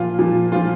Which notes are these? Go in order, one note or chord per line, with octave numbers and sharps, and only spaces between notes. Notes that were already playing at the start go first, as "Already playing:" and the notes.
Already playing: A#2 F3 F4
A#2 F3
A#2 F3 F4